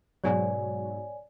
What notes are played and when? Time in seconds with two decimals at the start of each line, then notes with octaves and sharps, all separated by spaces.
0.24 G#2 B2 F#3 C#5 D5 G#5